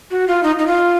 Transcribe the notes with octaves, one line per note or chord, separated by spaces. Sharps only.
F#4
F4
D#4
D#4
F4